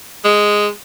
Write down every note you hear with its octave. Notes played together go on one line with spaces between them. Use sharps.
G#3